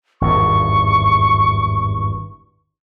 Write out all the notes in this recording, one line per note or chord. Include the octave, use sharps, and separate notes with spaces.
G#1 E2 G2 C#6